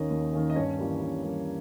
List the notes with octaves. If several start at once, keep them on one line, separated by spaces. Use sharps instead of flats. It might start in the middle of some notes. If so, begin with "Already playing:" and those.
Already playing: D#2 D#3 A#3 C#4 D#4 D#5
D#2
D#3 A#3 C#4
D#5
G2 C#4 C#5
E3 G3 A#3
G2
E3 G3 A#3